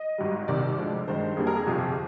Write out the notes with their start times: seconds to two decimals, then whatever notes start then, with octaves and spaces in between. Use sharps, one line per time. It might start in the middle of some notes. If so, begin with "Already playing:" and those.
Already playing: D#5
0.18 G#1 G#2 G3
0.48 C2 C3 D#3 D5
0.78 D2 D3 F3 G#3 D4
1.08 G2 D#3 G#3 C5
1.37 F2 D3 G3 A#3 G#4
1.47 A#4
1.56 G#4
1.66 G1 F2 C3 F3